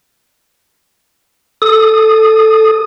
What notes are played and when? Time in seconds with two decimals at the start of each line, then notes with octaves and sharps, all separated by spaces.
1.62 A4 D#6